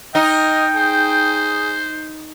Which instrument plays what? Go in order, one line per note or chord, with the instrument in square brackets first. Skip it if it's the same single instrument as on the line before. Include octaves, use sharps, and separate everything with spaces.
[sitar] D#4 [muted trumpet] A#4 [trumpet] D#5 [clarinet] G5
[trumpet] G#4 [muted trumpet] C5